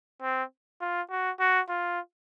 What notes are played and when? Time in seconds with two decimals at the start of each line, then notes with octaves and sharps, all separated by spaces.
0.22 C4
0.81 F4
1.10 F#4
1.40 F#4
1.69 F4